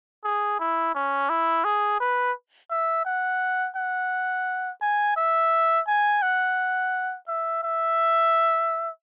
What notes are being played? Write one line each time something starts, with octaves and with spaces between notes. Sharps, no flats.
G#4
E4
C#4
E4
G#4
B4
E5
F#5
F#5
G#5
E5
G#5
F#5
E5
E5